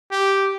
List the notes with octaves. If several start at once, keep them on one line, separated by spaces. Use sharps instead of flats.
G4